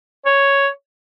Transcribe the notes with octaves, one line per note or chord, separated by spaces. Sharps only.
C#5